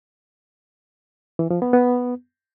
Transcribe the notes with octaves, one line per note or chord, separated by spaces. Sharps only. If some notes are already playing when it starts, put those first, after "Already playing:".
E3
F3
B3
B3